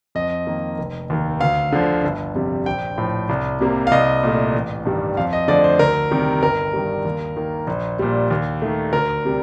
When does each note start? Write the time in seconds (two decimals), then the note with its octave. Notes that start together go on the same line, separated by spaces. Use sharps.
0.15 F2 D#5
0.47 D#3 A#3
0.78 F1
1.10 D#2 D#3
1.40 D2 F5
1.72 D3 F3
2.04 G1
2.35 F2 C3 G3
2.66 A#1 G5
2.98 A2 F3
3.29 C2
3.60 C3 G3 A#3
3.87 F5
3.91 C2 D#5
4.23 A#2 A3
4.54 A1
4.86 G2 D#3 G3
5.17 F2 F5
5.33 D#5
5.48 D3 F3 A3 D5
5.64 C5
5.79 D2 A#4
6.11 C3 D#3 G3
6.42 G1 A#4
6.73 G2 D#3 G3
7.05 D#2
7.37 D#3 A#3
7.67 A#1
7.99 A#2 G3
8.31 D#2
8.62 D#3 A3
8.93 D2 A#4
9.25 C3 G3